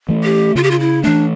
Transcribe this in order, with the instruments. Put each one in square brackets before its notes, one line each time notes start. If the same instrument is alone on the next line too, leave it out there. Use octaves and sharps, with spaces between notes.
[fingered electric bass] E3 A3
[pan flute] G4
[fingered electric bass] C#3 [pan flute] F4
[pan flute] G4
F4
E4
[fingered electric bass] E3 A3 [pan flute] D4